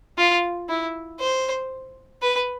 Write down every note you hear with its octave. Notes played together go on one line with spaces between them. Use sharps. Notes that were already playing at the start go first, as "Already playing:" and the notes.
F4
E4
C5
B4